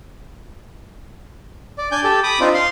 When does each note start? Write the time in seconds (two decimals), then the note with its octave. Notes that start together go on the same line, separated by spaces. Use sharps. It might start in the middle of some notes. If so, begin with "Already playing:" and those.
1.78 D5
1.92 D4 D5 G#5 G6
2.04 G4 A4
2.23 B5 D6 D#6
2.40 C4 D4 D#4 F4
2.54 F5 C6